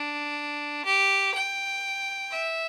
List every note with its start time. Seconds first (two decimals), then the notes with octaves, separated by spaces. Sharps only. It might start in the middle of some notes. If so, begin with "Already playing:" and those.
Already playing: D4
0.85 G4
1.34 G5
2.31 E5